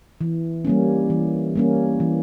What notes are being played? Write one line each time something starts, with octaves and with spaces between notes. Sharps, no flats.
E3
G3 A#3 C#4
E3
G3 A#3 C#4
E3